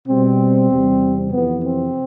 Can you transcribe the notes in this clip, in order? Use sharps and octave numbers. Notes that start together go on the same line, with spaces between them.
B2 G3 C4
E2 C3 G3
F2 C3 E3 B3
C4